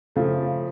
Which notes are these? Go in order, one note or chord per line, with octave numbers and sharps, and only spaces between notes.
C#3 F3 A3